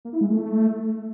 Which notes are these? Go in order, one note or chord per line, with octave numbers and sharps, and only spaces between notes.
A#3
E4
G#3
A3